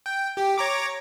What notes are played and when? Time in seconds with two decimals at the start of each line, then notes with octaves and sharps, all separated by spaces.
0.06 G5
0.37 G4
0.58 C#5 A#5 D6